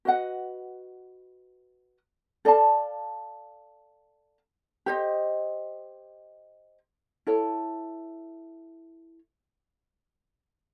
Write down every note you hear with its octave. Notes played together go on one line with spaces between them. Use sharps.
F#4 B4 D#5 F#5
A4 D5 F5 A5
G4 C5 D#5
E4 A4 C#5